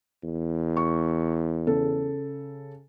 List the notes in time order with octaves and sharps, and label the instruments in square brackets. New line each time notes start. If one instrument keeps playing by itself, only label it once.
[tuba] E2
[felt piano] C#6
C#3 A4